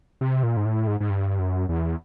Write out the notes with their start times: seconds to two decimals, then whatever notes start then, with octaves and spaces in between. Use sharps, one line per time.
0.21 C3
0.43 A#2
0.57 G#2
0.65 A2
0.87 G#2
1.00 G#2
1.10 G2
1.39 F#2
1.69 E2